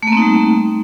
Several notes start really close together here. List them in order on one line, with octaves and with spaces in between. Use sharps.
A3 A#3 C4 D#4 G3